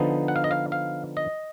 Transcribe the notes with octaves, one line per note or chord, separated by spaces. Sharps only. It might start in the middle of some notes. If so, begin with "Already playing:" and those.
Already playing: D3 F3 B3 D#4
F#5
F5
D#5
F5
F5
D#5